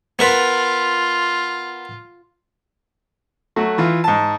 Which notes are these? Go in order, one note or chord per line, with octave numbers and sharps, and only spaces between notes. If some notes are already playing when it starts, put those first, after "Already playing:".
B3 F4 A#4 B4
F#3 A3 F#4
E3 F4
G#2 A5